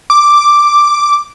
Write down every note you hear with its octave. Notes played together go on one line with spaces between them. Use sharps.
D6